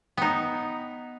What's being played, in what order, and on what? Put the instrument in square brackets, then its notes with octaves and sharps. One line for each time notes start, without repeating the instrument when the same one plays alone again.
[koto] B3 D#4 [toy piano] G5 A#5